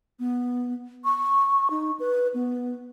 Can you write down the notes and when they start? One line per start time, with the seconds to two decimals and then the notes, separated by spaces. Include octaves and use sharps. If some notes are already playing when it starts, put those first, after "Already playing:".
0.19 B3
1.05 C#6
1.71 D#4
2.00 B4
2.34 B3